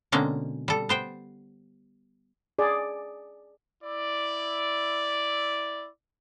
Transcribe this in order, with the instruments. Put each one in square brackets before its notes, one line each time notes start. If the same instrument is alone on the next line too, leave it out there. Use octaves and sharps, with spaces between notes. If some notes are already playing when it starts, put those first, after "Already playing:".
[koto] B2 D3 G#3 A#3 C4 C#4
G3 A4
B3 C5 G5
[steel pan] G#4 D5
[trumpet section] E4 D5